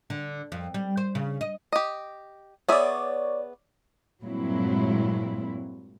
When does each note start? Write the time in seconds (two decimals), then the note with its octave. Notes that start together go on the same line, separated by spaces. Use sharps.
0.10 D3
0.52 F2
0.74 G3
0.97 C5
1.15 C#3
1.41 D#5
1.72 G4 D#5
2.68 B3 G#4 C#5 D5 E5
4.23 G2 A#2 F#3 G#3 C4 E4